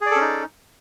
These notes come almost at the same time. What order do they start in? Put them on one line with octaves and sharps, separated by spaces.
G#4 D5 A4 C#4 D#4